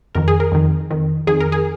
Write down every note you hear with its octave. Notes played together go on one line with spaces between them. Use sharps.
F2 D#3 A#4
G#4
A#4
F2 D#3
F2 D#3
F2 D#3 G#4
A#4
G#4